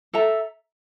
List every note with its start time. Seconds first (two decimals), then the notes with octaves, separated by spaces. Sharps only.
0.13 A4 E5 A#5